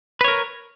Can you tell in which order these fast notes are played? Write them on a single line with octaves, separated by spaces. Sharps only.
B4 C#5 A#4